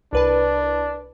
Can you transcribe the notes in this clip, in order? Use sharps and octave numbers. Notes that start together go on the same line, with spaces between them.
C2 D4 B4 A5